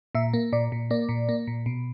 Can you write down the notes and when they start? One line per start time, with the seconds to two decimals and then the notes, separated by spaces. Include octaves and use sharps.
0.15 A#2 E5
0.34 A#3
0.53 A#2 D5
0.72 A#2
0.91 A#3 D5
1.09 A#2
1.29 A#3
1.47 A#2
1.66 B2